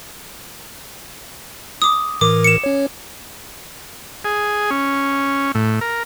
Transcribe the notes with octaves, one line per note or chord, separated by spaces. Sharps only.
D6 D#6
A2 E3 A#4 D6
C#7 E7
C#4 C#5
G#4
C#4
A2
A#4